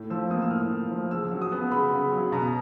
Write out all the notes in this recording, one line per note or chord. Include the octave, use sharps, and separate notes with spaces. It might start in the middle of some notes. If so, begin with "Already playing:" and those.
Already playing: A2
F3 E6
A#3 D#6
E6
A2 F6
A2
F3
C#3 E6
F#3
D#6
B3
C#3 B5
C#3
F#3
B2 A#5